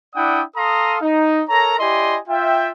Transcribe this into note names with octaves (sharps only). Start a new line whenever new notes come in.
D4 E4 D5 F#5 G5 D#6
A4 F5 A#5 C6 D#6
D#4
A4 A#4 C#5 A#5
E4 G4 D5 D#5 G#5 C6
F4 E5 G5